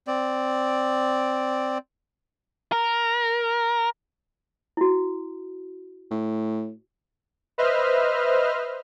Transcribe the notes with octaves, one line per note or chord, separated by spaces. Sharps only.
C4 D5
A#4
E4 F#4
A2
B4 C5 D#5 E5 F6